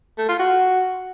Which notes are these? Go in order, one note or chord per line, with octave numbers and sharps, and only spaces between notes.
A3
F4
F#4